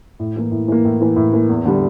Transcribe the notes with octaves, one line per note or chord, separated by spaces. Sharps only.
A2
E3 A#3
A2
E3 A#3
A2
E3 A#3
A2
E3 A#3
E2
D3 G3